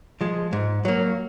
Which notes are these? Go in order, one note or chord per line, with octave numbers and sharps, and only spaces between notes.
F3 G#3
G#2
F#3 A#3